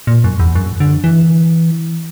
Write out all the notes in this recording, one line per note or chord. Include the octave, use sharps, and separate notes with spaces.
A#2
F#2
E2
F#2
D3
E3